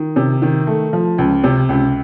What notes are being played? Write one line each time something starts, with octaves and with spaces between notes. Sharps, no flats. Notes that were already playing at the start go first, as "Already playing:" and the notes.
Already playing: D#3
C3
D#3
A3
F3
C#2
C3
C#2